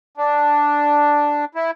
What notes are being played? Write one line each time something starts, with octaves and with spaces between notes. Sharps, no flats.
D4
E4